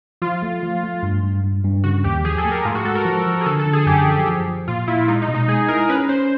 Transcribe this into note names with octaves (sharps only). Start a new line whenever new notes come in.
F3 F4
A3
F3
A3
G2
G2
G2
G2
C#3 F#4
D#2 G4
F3 G#4
A4
A3
A#4
G#2 F4
F#4
G#3 A4
A#4
F3
F3
G#4
D3 A4
A4
D3
G#4
F#2 G4
F3
F3
F3
A#2 F4
A#2 E4
G#3 D#4
D#4
B2
D#4
G#3 G#4
E4 A#4
C#4 B4
C#4 C5